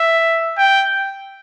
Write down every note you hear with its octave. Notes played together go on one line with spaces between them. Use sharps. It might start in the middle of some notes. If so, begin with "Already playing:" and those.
Already playing: E5
G5